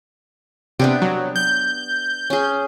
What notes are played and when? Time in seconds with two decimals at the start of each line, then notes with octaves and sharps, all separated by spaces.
0.79 C3 B3 D4 G4
1.02 F#3
1.36 G6
2.30 C#4 G#4